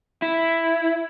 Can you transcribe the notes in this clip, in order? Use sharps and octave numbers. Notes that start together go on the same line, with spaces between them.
E4